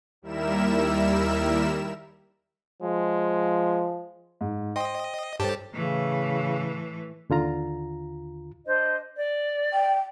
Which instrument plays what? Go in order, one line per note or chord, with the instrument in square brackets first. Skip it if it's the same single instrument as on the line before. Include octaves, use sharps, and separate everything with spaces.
[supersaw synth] D#2 G3 E4 A#4 E5 E7
[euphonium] F3 [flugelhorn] G#3
[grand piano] G#2
[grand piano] C5 G5 C6 [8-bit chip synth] D#5
[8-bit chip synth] G2 G4 A5 [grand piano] A4 C5 C#5
[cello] A2 E3 [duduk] C#3
[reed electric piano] D#2 D3 F4 A#5
[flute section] D4 C5 D#5
D5
[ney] G5